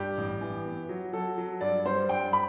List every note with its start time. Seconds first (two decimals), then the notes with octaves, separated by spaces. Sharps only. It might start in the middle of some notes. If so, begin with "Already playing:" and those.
Already playing: G2 G4
0.18 A1
0.41 E3
0.65 B3
0.89 F#3
1.13 F#3 A4
1.38 F#3
1.61 G2 D5
1.85 G3 C5
2.09 G2 G5
2.33 B5